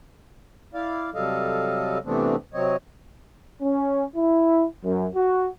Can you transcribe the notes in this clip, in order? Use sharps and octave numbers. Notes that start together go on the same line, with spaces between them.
E4 D5 F5
C3 F#3 G3 A4 D#5 F5
C3 E3 A3 B3 C4 D4
C3 F#3 C4 C#5 D#5
C#4
E4
F#2
F#4